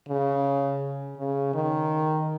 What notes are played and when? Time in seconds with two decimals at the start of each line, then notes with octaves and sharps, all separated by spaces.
0.09 C#3
1.18 C#3
1.54 D#3